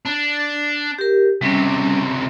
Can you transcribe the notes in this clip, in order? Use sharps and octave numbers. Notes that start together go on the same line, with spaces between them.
D4
G4 A#4
C#2 C3 G3 C#4